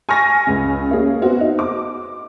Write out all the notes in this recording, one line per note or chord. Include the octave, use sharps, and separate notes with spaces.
G#5 C#6 F6 A6 A#6
C#2 C#3
A#3 C#4 G#4
B3 C4 F#4
D#4
D6